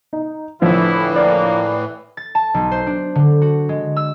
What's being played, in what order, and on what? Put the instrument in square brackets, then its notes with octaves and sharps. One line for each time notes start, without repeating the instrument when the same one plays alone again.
[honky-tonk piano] D#4
[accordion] A2 E3 [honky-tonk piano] D3 F3 [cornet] E4
[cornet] A#3 [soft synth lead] D5
[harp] A6
A5
B1
C5
D4
D3
F#4
G#3
E6